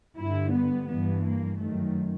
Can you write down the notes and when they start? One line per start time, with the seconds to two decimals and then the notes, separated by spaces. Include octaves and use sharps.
0.18 G2 D3 E4
0.53 B3
0.89 G2 E3 B3
1.25 A#3
1.60 F#2 D#3 A3